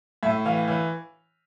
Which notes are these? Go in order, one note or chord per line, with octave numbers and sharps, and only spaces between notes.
A2 E5
E3 F5
E3